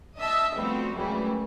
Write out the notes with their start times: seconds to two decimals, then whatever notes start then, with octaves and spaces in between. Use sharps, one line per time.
0.17 D4 D#5 E5 A5
0.55 F3 G3 A3 B3 C4 F#4
0.94 C#2 F#2 C#3 E3 G3 A3